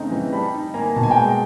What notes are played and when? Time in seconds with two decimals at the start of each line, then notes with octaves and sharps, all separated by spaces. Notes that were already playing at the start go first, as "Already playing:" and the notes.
Already playing: C#3 A3 C4 D#4 A#5
0.11 E3
0.33 G3 A5 B5
0.54 D#4
0.74 A#3 G#5 A#5
0.96 B2 A5
1.03 G#5
1.10 G5 A5
1.16 G#3